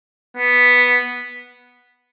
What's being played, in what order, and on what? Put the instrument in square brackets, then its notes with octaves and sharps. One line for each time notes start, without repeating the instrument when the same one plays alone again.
[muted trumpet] B3